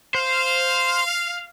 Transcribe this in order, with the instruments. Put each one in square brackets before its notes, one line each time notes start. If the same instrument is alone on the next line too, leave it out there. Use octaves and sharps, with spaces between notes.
[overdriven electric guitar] C5 [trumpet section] F5